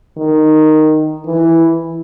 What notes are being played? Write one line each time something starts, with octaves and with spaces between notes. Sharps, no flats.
D#3
E3